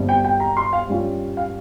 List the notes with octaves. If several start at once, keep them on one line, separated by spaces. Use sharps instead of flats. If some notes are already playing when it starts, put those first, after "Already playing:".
Already playing: G1 G2 G3 C4
G5
G5
A#5
C6
F5
G2 G3 C#4 F4
F5